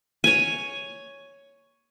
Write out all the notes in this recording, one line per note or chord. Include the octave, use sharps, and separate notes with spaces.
C#5 G#5